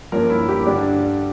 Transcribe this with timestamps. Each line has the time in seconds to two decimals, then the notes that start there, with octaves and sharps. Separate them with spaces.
0.12 G2 F3 A#3 C#4 A#4
0.30 E4
0.49 G4
0.66 G2 D3 G3 D4